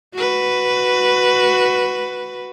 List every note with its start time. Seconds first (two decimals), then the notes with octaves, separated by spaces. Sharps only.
0.14 F#4 B4